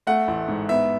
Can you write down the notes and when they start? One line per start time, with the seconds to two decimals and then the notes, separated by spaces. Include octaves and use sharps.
0.07 A3 F#5
0.28 A1
0.48 G#2
0.69 B3 E5